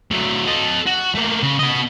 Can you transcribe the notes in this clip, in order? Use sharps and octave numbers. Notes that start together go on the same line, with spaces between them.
F#3 A3
A4 D#5
F#4
A3 A#3
C#3
B3 D#5